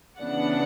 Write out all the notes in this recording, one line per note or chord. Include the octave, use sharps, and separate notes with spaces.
C#3 E3 B3 D4 D5 F#5